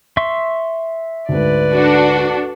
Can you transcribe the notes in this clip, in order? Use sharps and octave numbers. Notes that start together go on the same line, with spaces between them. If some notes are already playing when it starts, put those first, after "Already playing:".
E5 C6 C#6
D2 G#2 B4 D5
D4 F#4 A4